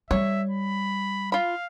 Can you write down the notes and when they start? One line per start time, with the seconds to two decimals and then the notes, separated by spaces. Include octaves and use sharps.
0.11 G3 C#5 E5
0.51 B5
1.32 F4 F5 B5